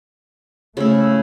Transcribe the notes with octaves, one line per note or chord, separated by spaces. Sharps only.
C#3 A3 E4